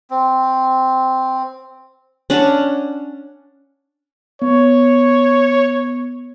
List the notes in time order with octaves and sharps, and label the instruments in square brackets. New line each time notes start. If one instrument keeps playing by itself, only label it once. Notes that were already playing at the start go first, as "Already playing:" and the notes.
[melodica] C4
[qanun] C#4 D4 F#5 A5
[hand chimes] B3 [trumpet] C#5